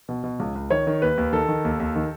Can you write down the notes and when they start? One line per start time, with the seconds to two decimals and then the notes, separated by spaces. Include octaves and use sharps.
0.09 B2
0.24 B2
0.39 C#2
0.55 C#2
0.70 D#3 C#5
0.87 D#3
1.02 D#2 B4
1.18 D#2
1.33 D#3 A4
1.48 D#3
1.65 D#2
1.80 D#2
1.96 D#3